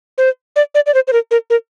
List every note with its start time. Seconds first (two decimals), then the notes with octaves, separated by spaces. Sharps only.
0.18 C5
0.56 D5
0.75 D5
0.86 D5
0.94 C5
1.08 C5
1.13 A#4
1.31 A#4
1.50 A#4